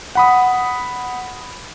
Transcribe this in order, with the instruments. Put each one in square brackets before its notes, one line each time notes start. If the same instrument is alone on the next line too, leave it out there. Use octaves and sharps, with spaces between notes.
[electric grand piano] F#5 B5 D#6